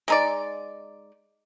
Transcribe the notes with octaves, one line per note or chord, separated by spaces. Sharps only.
G#3 D#4 D5